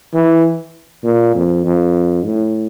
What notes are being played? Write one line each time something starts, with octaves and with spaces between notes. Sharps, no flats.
E3
A#2
F2
F2
A2